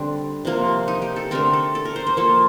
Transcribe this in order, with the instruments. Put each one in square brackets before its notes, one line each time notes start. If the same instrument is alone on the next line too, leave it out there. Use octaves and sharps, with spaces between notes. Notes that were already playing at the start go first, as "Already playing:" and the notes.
Already playing: [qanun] D3 G3 C4 D4
C3 F3 A#3
D#4
G4
A4
D3 A3 C4 A#4
A4
A4
A#4
C5
C5
F3 A#3 A4